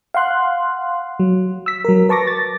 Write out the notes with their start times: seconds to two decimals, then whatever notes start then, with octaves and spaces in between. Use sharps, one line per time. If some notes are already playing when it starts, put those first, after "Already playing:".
0.14 F5 F#5 C6 F#6
1.20 F#3
1.66 E6 B6
1.85 F#3 A#4
2.09 B4 A5 C#6 D6 A#6
2.27 A6